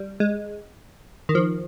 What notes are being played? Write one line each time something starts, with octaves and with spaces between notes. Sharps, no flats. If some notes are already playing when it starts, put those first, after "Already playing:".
Already playing: G3
G#3
D#3
F3